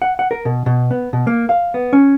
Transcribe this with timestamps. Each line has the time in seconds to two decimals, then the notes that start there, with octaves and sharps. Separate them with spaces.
0.02 F#5
0.19 F#5
0.31 A#4
0.45 B2
0.66 B2
0.91 B3
1.13 B2
1.27 A#3
1.49 F5
1.74 B3
1.93 C#4